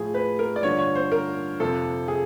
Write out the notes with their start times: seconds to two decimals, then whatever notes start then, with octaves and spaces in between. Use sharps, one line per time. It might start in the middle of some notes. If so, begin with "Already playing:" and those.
Already playing: A2 F3 G#4
0.14 B4
0.39 A#4
0.56 D5
0.63 G2 D3 F3 C#5
0.79 C#5
0.95 C5
1.12 A#4
1.60 F2 C3 F3 A4
2.08 G#4